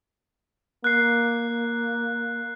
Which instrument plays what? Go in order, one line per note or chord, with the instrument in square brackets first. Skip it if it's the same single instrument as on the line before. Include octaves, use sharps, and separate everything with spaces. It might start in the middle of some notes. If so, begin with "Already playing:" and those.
[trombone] A#3 [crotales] F#6 C7